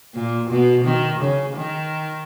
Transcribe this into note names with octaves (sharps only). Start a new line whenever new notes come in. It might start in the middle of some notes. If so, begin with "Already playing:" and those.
A#2
B2
D#3
C#3
D#3